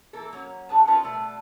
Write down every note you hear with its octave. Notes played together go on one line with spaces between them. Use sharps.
E3 A#3 E4 G4 A4 A#4
F#3 A#3 C#4
B2 D4 G#4 B4 A5
C#4 D#4 F4 F#4 A#4 B4
B2 G3 A3